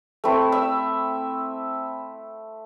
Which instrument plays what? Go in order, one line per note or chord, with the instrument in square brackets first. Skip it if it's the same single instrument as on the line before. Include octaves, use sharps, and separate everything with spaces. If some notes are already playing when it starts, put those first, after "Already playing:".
[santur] A3 C4 E4
E5